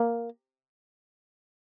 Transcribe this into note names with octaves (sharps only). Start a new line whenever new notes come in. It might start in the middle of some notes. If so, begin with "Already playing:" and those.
Already playing: A#3